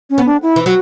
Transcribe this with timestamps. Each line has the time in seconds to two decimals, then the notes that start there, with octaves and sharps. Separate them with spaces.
0.10 C#4
0.18 B3
0.26 D4
0.42 E4
0.56 E3
0.66 F#3 F#4